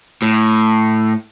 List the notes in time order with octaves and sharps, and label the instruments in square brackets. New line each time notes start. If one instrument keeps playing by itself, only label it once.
[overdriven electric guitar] A2